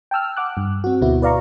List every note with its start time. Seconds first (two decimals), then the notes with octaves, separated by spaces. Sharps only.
0.11 G5 A5 E6 F6
0.37 F#5 D6 F#6
0.57 G2
0.84 C4 F#4
1.01 D2 B2 B3 E4 F#4
1.22 B4 D5 F5 A#5 C#6